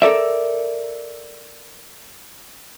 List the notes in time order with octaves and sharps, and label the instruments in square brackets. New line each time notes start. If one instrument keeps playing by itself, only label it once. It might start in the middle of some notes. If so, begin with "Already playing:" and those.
[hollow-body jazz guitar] A4 A#4 D5 E5